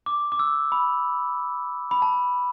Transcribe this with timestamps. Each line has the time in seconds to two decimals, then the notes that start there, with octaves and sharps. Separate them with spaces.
0.06 D6
0.32 D6
0.39 E6
0.72 B5
1.91 B5
2.02 A5